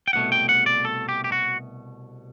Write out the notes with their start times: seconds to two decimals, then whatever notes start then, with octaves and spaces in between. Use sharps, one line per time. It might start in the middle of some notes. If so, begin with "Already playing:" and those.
0.08 G5
0.13 C2 B2 A3 F#5
0.32 G5
0.49 F#5
0.66 D5
0.85 A4
1.09 G4
1.24 G4
1.32 F#4